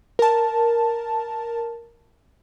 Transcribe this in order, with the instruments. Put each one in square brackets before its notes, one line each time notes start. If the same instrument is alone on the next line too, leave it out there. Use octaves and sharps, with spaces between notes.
[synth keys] A#4 A5